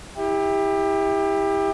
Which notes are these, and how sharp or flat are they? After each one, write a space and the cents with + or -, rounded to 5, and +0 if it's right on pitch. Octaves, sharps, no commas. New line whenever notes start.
E4 -20 G4 +25